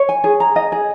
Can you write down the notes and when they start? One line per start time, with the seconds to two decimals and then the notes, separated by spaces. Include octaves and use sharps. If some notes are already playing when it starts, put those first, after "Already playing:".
Already playing: C#5
0.09 G#5
0.24 G#4
0.40 A#5
0.56 D#5
0.72 G#4